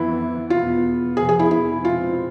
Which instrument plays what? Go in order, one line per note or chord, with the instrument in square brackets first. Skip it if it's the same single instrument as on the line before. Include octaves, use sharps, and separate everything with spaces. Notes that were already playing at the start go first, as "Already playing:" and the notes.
Already playing: [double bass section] F2 E3 B3 [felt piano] E4
[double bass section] E2 B2 B3 [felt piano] F4
[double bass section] F2 C3 F3 B3 [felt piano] G#4
[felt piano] G#4
E4
E4
[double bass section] B2 G#3 C4 [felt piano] F4